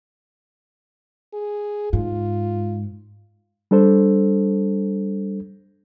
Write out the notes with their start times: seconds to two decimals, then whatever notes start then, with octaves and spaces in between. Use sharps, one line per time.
1.34 G#4
1.93 G#2 F4
3.71 G3 D4 A4 C5